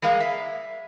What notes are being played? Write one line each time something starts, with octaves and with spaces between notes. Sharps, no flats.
G3 G#3 A#3 F5
E5